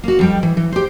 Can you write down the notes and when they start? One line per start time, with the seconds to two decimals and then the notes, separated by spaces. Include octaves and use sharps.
0.04 A#3 F#4
0.19 F2 G3 G5
0.43 E3
0.57 E3
0.72 G4 C5